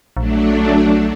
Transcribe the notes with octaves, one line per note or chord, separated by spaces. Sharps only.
A#1 F#3 A3 D4